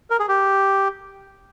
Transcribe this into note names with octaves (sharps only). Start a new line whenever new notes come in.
A#4
G#4
G4